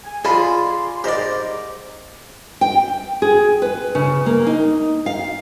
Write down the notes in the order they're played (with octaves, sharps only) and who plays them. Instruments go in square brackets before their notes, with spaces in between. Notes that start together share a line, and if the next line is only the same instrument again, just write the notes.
[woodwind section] G#5
[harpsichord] F4 D#5 [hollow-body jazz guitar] G#4 A5 B5 [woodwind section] D5 G#5 C6
[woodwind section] G#2 [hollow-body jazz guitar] G4 C5 D#5 [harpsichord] A#4 D5
[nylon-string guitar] G5
G#4
B4
C#3
A#3
D#4
F5